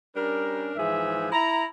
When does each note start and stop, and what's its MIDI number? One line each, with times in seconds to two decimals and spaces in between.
0.16 0.72 55
0.16 0.72 61
0.16 0.72 62
0.16 0.72 70
0.76 1.31 44
0.76 1.31 52
0.76 1.31 53
0.76 1.31 68
0.76 1.31 76
1.32 1.65 64
1.32 1.65 82